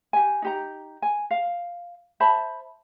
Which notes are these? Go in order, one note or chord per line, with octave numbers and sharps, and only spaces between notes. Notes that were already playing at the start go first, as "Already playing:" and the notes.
G4 G#5
D#4 G4 A#5
G#5
F5
C5 E5 A5 B5